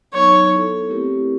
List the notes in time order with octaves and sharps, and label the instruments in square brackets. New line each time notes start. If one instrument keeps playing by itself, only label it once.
[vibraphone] F#3 B3 D#4 [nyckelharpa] C#5
[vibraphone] B3 E4 A4
A3 C4 E4 G4 A#4